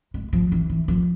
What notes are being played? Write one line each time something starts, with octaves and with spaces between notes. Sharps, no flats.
G#3
F3
E3
E3
F3